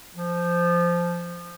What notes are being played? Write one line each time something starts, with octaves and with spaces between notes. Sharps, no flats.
F3